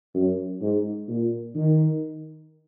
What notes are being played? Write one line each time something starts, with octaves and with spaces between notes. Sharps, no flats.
F#2
G#2
A#2
D#3